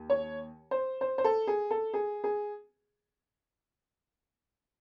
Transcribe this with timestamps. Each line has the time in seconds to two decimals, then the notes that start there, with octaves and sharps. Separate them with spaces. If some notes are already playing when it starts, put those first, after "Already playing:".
Already playing: D#2
0.10 C#5
0.71 C5
1.01 C5
1.18 C5
1.24 A4
1.47 G#4
1.71 A4
1.94 G#4
2.24 G#4